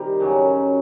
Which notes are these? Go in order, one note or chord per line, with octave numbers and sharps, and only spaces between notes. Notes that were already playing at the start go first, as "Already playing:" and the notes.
Already playing: C3 D#3 G3
F#2 C#3 F#3